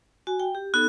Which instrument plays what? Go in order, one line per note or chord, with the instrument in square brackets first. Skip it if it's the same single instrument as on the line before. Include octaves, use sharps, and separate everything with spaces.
[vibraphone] F#4 G#5
G5
G4
[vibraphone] B3 D#4 A4 [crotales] F#6